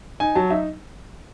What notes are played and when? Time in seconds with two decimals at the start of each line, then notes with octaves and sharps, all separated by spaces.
0.20 D#4 G#5
0.35 F#3 A5
0.50 D#4 E5